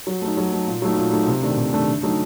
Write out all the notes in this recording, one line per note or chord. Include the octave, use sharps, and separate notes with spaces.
F#3
A3 D#4
F#3
A3 D#4
A#2
F#3 A3 D#4
A#2
F#3 A3 D#4
C3
D#3 A3 D4
C3
D#3 A3 D4
D3
F#3 A3 D#4